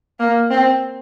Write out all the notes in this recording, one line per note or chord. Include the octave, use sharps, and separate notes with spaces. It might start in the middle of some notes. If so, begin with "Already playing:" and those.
A#3
C4